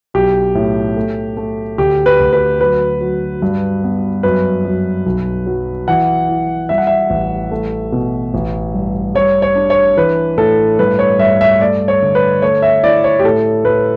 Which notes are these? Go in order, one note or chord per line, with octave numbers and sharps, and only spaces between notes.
B1 G4
A2
A3
A3
D2 G4
B4
D2
B4
F#3 B4
F#3
G2
B3
F#2 B4
F#2
B1
F#3
E3 F#5
E4
G3 E5
F#5
E5
A1
A3
B2
A1
G2
G3 C#5
C#5
D4
C#5
E3 B4
A2 A4
G2 B4
C#5
G2 E5
E5
A3 D5
C#5
D3
B4
A3 C#5
E5
E4 D5
C#5
G4
A2 A4
A2 B4